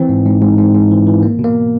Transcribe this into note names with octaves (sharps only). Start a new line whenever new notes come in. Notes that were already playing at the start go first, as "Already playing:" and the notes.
Already playing: E3 C4
G#2
G#2
G#2
G#2
G#2
E3
E3
A#3
B2
A#3